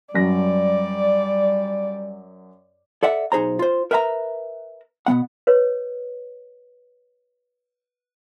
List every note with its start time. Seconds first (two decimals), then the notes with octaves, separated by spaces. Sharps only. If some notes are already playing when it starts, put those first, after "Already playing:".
0.14 F#2 F#3 G3 D5 A#6
3.03 A4 D5 E5 F#5
3.32 B1 D#4 G#4 C5 A#5
3.59 F4 C5
3.91 A#4 B4 E5 F#5 A#5
5.06 B2 F3 B3 F#5
5.47 B4 C#5